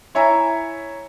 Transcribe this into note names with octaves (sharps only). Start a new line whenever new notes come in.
E4 C#5 E5 G#5 A#5